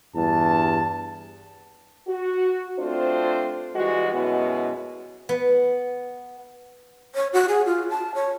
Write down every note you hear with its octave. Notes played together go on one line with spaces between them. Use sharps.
E2 G2 A5
F#4
A3 C4 D4 F4 C5
E3 G3 G#3 F#4
F#2 B2 G#3 B3 E4 F#4
B3
C#5
F#4
G#4
F4
A5
C#5